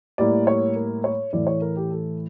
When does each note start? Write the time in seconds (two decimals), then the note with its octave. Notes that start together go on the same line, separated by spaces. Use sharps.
0.18 A2 G3 A#3 E4 D5
0.47 C#5
0.76 A#4
1.04 C#5
1.33 A2 E3 A3 E4 D5
1.47 C#5
1.62 A#4
1.76 G4
1.91 A4